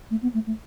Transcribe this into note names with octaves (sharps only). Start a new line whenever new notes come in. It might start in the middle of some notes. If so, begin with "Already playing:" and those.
A3
B3
A3
A3